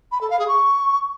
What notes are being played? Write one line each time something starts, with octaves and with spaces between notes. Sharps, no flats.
B5
A4
F5
G#4
C#6